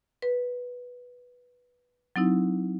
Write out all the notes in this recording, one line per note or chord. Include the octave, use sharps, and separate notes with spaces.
B4
F#3 C4 D#4 E4